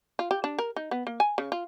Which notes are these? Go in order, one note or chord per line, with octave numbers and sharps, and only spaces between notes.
F4
G4
D4
A#4
D#4
B3
A#3
G#5
C#3
F4